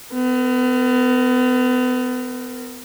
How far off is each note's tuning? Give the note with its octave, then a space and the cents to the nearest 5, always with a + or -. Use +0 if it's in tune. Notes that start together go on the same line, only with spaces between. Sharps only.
B3 +35 A#4 -20